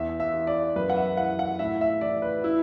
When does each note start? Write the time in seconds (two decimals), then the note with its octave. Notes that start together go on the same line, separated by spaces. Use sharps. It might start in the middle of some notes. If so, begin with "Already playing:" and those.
Already playing: E2 E5
0.20 E5
0.34 E3
0.47 D5
0.76 F#2 B4
0.90 F#5
0.96 E5
1.17 E3 F#5
1.39 F#5
1.59 A2 E5
1.81 E5
2.01 E3 D5
2.22 B4
2.44 E4